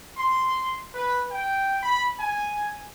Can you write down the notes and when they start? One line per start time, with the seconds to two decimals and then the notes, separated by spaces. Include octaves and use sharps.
0.18 C6
0.94 B4
1.31 G5
1.83 B5
2.19 G#5